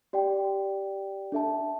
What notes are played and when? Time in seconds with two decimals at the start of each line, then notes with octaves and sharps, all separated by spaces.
0.13 G4 D5 G5
1.32 D4 A4 E5 A5